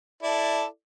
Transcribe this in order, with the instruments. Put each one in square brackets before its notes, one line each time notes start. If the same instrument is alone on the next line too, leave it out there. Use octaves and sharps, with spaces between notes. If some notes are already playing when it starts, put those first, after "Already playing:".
[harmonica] E4 A4 D5